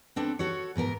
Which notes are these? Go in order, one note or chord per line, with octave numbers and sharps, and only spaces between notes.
B3 C4 D4 A4
F#4 A4 C#5
G#2 B2 B3 A#4